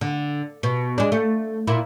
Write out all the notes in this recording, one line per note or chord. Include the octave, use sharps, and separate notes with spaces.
D3
B2
G#3 D4
A3
A#2 E4